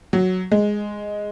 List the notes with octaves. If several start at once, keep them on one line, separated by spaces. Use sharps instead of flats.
F#3
G#3